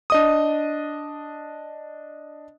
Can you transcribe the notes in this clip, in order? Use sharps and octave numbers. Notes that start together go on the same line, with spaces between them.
D4 D#5 D#6